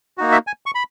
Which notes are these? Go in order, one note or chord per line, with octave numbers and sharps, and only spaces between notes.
A#3 D#4 F#4
E5
G#5
C#6
B5